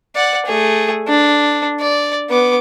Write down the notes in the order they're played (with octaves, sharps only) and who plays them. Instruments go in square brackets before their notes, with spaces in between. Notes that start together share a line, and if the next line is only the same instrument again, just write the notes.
[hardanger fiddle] D5 F#5
A3 G#4
D4
D5
B3 D6